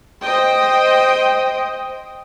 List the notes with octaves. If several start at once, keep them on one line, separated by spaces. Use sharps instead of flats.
C5 D#5 G5